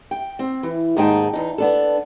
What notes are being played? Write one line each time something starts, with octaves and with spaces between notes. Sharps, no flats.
G5
C4
E3
D#2 G#2 D#4 G#4 G5 A5
E2 D#4
B3 D4 A4